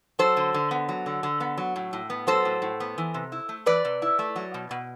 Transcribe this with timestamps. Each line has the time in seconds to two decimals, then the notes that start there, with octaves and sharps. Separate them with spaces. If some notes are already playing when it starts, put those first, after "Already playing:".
0.19 F#3 A4 C5
0.37 D3
0.54 D3
0.71 B3
0.89 F#3
1.06 D3
1.23 D3
1.40 B3
1.57 F#3
1.76 A2
1.93 A2
2.10 B3
2.27 F#3 A4 C5
2.45 A2
2.62 A2
2.80 B3
2.98 E3
3.14 C3
3.32 E4
3.49 A3
3.66 E3 B4 D5
3.85 C3
4.02 E4
4.19 A3
4.36 F#3
4.54 B2
4.71 B2